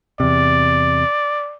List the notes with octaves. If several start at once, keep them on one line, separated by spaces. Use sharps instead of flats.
E2 C3 D5